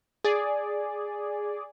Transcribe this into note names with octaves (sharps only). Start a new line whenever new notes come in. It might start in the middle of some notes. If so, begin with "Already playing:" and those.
G#4 D5